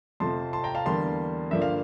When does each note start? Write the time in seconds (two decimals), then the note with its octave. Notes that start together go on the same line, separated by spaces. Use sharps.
0.20 F2 C3 F3 A3 A5 C6
0.53 A5 C6
0.64 G5 A#5
0.75 F5 A5
0.85 E2 D3 G3 A#3 A5 C6
1.51 G2 D3 F3 A#3 D4 E5
1.62 F5